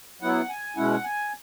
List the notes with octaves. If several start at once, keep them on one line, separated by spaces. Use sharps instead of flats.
F#3 B3 E4 F#5
G#5
B2 G#3 C#4 E4 F#5
G#5